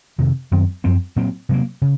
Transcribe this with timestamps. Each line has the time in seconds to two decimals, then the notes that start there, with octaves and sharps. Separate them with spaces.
0.18 F2 C3 D#3
0.51 F#2 D#3 F#3 C4
0.84 F#2 F3 C4
1.16 A#2 F#3 C4
1.49 C3 F#3 A#3
1.82 C#3